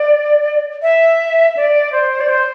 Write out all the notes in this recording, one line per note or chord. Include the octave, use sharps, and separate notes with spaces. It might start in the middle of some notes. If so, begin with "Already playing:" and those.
Already playing: D5
E5
D5
C5
D5
C5